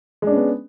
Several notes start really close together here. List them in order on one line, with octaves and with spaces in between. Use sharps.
G#3 D4 C#4 B3